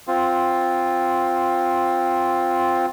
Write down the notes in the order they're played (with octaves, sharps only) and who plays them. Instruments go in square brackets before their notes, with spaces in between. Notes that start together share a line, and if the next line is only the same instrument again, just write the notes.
[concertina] C4 F4